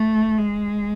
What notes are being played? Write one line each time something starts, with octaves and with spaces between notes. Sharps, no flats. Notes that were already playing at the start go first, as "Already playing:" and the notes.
Already playing: A3
G#3